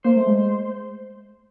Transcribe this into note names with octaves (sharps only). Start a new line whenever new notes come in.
A#3 C5
A3
G#3